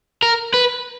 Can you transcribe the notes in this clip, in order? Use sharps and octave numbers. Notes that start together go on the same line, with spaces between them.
A#4
B4